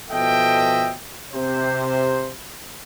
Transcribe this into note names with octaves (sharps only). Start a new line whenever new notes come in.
B2 F3 A4 D#5 E5 G5
C3 C5